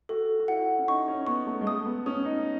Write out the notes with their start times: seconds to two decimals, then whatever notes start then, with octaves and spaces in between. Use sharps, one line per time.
0.09 F#4 A4
0.39 F#4
0.48 E4 F#5
0.79 C#4
0.88 D#4 C#6
1.08 C#4
1.27 B3 C#6
1.46 A3
1.61 G#3
1.66 A3 D#6
1.86 B3
2.06 C#4 D#6
2.25 D#4